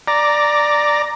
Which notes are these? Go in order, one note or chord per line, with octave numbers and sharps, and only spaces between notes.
D5 A#5